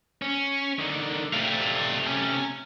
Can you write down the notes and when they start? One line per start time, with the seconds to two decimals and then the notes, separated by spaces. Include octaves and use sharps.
0.22 C#4
0.79 D3 D#3
1.33 C3 A3 D5 F5
2.07 C#4